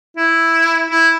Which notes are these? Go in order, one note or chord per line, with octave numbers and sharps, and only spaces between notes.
E4
E4